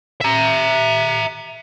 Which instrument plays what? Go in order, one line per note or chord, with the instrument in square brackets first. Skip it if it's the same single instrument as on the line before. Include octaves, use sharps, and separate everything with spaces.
[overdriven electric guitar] E5 A#5